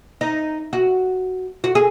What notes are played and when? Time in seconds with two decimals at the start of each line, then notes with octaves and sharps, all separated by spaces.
0.21 D#4
0.73 F#4
1.64 F#4
1.75 G#4